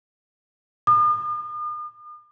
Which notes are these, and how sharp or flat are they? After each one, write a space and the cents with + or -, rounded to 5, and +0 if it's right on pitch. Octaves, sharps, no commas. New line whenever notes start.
D#6 -45